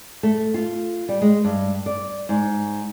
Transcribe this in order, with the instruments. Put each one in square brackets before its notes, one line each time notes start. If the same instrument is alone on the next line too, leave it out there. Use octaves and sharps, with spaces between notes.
[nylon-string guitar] A3
F4
G3
G#3
G2
D5
G#2